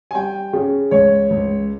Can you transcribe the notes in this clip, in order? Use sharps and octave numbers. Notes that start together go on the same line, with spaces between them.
G#5
G3 G5
C#3
C#2 C#5
C#2